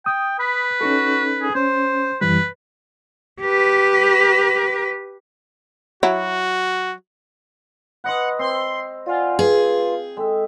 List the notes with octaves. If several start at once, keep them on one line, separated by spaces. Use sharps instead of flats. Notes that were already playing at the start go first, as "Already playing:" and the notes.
G5 D#6
B4 B5
C#4 D#4 F#4 A4
G#4
C#4 C5
F#2 E3 G3 B4
G4 B4
F#3 E4 F#4
B4 D#5 F#5 C6
C4 C6
F4 D5 F#5 G#5
G#4 B4
G#3 A4 E5 G5